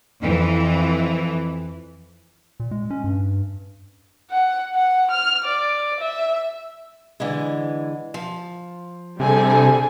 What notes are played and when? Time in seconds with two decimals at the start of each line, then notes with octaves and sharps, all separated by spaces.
0.20 F2 E3
2.60 A#2
2.71 G#3
2.90 C#4
3.04 G2
4.31 F#5
4.75 F#5
5.11 F6
5.45 D5
6.00 E5
7.20 D3 E3 G#3
8.14 F3
9.20 C3 G3 D4 G#4 A4 G#5